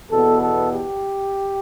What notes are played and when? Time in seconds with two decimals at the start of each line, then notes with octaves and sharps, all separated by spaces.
0.11 E2 B2 B3 A4
0.41 A4
0.71 G4